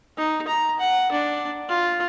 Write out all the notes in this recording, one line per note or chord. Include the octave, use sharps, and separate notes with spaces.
D#4
A#5
F#5
D4
F4